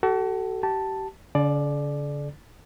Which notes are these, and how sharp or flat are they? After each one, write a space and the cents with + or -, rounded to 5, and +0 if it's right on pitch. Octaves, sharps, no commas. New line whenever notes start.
F#4 +40 A4 +0
G4 -30 A5 +0
D3 -45 A4 -45 D5 +10